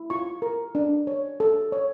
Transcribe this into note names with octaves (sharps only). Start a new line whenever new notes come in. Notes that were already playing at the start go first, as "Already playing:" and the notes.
Already playing: E4
F4 C#6
A#4
D4
C#5
A4
C#5